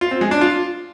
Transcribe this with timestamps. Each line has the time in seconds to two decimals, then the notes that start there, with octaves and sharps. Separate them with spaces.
0.01 F4
0.11 C4
0.21 G#3
0.31 D4
0.41 F4